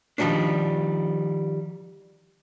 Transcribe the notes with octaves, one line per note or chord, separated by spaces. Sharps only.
D#3 F3 G3 A3 C#4 D4